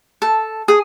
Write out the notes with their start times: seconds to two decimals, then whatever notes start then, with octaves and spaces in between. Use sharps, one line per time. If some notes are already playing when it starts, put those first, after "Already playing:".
0.22 A4
0.68 G#4